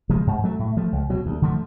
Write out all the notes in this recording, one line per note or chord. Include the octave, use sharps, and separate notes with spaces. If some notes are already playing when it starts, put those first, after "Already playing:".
C#3 F3 G#3
G#2
F#3 A3
A2
F3 A3
C#2
B2 F#3
D2
D3 F3 A3